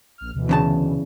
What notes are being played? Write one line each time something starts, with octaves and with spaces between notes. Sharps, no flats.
A#1 F6
D2 B2 E3
E2 C#3 A5